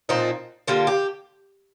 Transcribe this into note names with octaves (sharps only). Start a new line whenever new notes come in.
A#2 F3 C4 D#4
D3 G3 A#3 F4
G4